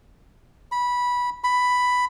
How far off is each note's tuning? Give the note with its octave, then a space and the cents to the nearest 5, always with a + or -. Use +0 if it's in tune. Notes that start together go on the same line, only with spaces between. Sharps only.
B5 -15
B5 +5